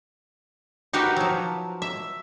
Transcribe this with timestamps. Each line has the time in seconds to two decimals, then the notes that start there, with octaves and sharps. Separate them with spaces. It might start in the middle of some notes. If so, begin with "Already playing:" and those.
0.93 D#4 F#4 G4 A#4 B4
1.16 F3 F#3
1.82 E5